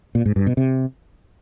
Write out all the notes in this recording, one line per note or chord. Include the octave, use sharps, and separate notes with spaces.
A#2
G#2
G2
B2
C3